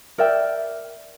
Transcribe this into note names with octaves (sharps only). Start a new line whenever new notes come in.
A#4 D5 E5 G5